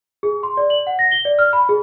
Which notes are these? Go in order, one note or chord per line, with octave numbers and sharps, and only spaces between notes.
G#4
C6
D5
F#7
F#5
A#6
G7
D5
F6
B5
G#4